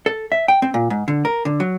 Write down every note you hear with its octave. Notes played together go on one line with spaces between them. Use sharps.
A4
E5
G5
C4
A#2
G#2
D3
A#4
D3
F#3